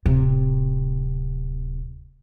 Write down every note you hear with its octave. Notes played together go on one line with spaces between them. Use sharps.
D1 C3